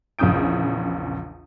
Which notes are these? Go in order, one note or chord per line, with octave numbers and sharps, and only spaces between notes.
A#1 E2 C#3 D#6 G6 D7